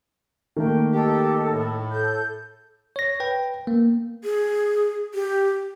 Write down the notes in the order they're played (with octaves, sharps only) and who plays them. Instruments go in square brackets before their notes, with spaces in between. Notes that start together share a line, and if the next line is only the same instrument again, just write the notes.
[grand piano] D#3 A3 A#3 [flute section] G5
[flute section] D#4 A4 [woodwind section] G4
[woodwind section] A2
[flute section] A4 G6
[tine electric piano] C#5 A#6
B4 G5
A#3
[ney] G#4
G4